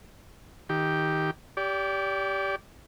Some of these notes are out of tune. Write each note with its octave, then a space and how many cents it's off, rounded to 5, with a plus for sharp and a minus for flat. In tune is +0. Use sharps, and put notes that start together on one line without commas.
D#3 +15 G4 +0
G4 +0 D5 -30